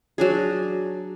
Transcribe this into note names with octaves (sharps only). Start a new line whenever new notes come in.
F#3 D4 G#4